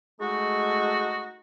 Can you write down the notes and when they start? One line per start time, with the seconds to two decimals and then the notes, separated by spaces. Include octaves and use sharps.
0.20 G#3 A3 D#4 F#4